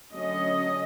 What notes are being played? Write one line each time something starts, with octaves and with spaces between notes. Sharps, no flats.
D3 F#3 A3 C#4 D#5